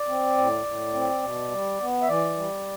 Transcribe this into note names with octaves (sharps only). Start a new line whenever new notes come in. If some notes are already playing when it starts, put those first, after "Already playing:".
Already playing: D5
C4
A2
A2
C4
B2
G3
B3
E5
E3 D5
G3